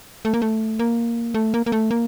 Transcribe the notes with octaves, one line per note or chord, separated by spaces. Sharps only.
A3
A#3
A3
A#3
A3
A#3
A#3
A3
A#3